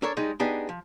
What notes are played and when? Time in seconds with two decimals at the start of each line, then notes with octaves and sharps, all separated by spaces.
0.02 D4 A4 A#4 C#5
0.17 G3 G#3 D#4
0.40 B3 D4 D#4 G4 G#4
0.69 F3